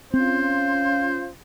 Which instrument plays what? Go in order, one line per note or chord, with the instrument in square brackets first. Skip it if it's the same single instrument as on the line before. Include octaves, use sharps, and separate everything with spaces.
[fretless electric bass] C4 [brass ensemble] C#4 F4 [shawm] C5